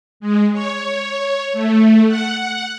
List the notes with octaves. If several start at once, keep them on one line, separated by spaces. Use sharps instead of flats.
G#3
C#5
A3
F#5